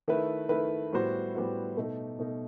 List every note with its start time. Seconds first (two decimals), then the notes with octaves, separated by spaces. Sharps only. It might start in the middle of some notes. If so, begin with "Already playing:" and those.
0.08 D#3 A3 E4 B4
0.49 D#3 A3 E4 B4
0.93 A2 G3 B3 F#4 C5
1.35 A2 G3 B3 F#4 C5
1.77 B2 A3 D#4
2.19 B2 A3 D#4